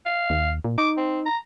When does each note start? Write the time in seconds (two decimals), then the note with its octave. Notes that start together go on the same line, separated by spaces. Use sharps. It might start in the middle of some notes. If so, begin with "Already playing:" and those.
0.06 F5
0.30 D#2
0.64 A#2
0.78 D#4 D6
0.97 C4
1.26 A#5